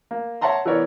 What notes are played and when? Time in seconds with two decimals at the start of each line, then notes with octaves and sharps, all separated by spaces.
0.11 A#3
0.41 C#5 E5 F#5 A5 A#5 C6
0.65 E3 B3 A#4 C#5 D5